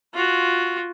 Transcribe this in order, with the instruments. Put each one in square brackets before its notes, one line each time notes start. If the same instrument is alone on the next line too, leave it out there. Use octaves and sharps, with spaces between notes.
[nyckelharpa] F4 F#4